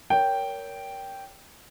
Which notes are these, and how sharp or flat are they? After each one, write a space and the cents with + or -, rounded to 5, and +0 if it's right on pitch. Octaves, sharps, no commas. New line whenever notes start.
A#4 +0 C#5 +20 G5 -5